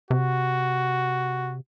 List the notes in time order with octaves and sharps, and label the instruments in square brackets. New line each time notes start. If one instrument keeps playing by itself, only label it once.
[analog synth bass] C3 [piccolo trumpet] F#4